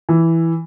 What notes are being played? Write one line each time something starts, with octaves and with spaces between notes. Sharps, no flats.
E3